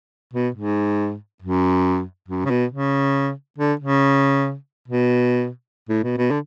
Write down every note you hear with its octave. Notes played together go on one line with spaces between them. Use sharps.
B2
G#2
F#2
F#2
C#3
B2
C#3
D3
C#3
B2
A2
B2
B2
D3